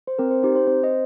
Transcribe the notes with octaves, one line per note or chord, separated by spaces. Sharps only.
C5
C4 A#4
C5
D#4 G4 C5
C5
C4 C5
C5 D#5